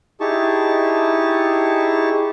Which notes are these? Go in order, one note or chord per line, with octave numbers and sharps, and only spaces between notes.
D#4 E4 G4 G#4 A5 C#6